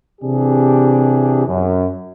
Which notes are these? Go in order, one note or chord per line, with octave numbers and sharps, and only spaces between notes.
C3 E3 D4 G4 G#4
F#2